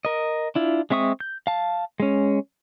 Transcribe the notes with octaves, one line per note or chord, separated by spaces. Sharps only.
A#4 D#5
D4 E4 F4
G#3 C4 E5 C#6 D#6
G6
F5 A5
G#3 C#4